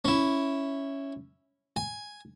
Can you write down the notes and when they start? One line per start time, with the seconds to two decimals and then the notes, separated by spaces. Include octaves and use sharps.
0.05 C#4 E4
1.76 G#5